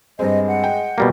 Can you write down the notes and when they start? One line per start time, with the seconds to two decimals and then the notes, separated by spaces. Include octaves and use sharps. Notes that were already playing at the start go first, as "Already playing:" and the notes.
0.19 G2 G#3 C4 D#5
0.48 F#5
0.64 G5
0.98 B2 G3 A#3